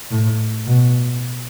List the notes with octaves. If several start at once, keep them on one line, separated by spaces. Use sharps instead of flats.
A2
B2